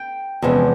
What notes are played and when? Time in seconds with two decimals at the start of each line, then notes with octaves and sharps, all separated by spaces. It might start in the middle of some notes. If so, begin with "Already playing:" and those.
Already playing: G5
0.42 E2 C3 F3 G#3 C#4